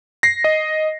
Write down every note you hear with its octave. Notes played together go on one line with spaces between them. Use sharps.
A#6 C7
D#5